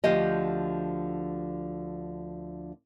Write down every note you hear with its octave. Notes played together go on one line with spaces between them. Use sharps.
D2 D3 F3 G4 D#5